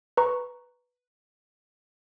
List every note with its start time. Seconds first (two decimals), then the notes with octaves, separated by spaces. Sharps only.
0.17 B4 A#5 C#6